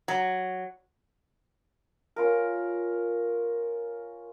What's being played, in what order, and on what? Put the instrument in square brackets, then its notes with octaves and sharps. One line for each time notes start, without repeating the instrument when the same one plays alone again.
[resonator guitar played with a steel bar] F#3
[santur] C#4 F4 A#4